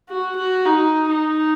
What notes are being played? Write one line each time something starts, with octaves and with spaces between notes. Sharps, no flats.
F#4
F#4
D#4
D#4